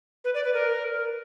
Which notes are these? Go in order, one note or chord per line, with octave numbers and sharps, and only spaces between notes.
B4
D5
B4
A#4